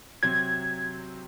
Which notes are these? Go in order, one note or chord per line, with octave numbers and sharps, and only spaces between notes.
C3 F#3 C4 G#6